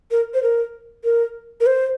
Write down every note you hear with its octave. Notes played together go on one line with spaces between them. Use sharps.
A#4
C5
A#4
A#4
A#4
C5